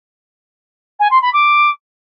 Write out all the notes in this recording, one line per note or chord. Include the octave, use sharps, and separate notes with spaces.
G#5
C6
B5
D6